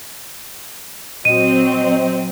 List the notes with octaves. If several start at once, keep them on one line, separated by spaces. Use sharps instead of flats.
A#2 F#3 C4 F#4 D#5 D#7